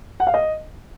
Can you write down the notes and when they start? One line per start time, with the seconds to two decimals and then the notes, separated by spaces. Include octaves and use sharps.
0.20 F#5
0.27 F5
0.34 D#5